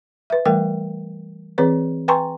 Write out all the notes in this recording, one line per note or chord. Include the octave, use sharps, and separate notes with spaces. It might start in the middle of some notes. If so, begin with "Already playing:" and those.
B4 E5
E3 G3 A3 A#4 G5
E3 C4 G#4 B4 C#5
B4 G5 G#5 A#5 C6 C#6